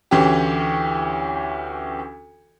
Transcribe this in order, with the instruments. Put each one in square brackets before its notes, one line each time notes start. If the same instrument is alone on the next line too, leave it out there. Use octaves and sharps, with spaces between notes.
[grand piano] D2 E3 C#4 G4